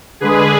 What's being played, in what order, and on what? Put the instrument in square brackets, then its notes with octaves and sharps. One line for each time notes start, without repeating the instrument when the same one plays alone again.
[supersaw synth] D3 G#3 G#4 B4